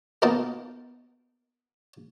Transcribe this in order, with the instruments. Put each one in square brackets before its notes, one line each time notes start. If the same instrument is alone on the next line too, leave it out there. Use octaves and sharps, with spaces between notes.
[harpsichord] A#3 B3 D#4 F4 D#5 A5